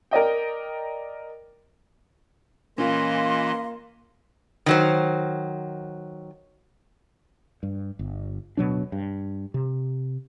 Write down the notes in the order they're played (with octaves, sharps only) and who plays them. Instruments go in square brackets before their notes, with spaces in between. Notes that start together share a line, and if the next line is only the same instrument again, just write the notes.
[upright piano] A#4 D5 D#5 G5
[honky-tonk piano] A#2 C#4 [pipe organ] E3 D#5 [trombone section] A#3 [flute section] F5 C6
[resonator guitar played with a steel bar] D#3 F#3 C5
[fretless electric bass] G2
G1
D1 B2 F#3 D4
G2
C3